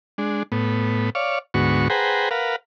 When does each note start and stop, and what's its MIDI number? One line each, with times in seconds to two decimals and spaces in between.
0.18 0.43 56
0.18 0.43 62
0.52 1.10 45
0.52 1.10 59
1.15 1.39 73
1.15 1.39 74
1.15 1.39 77
1.54 1.88 38
1.54 1.88 44
1.54 1.88 59
1.54 1.88 66
1.54 1.88 85
1.90 2.29 68
1.90 2.29 71
1.90 2.29 72
1.90 2.29 78
1.90 2.29 79
1.90 2.29 82
2.31 2.56 70
2.31 2.56 71
2.31 2.56 77
2.31 2.56 78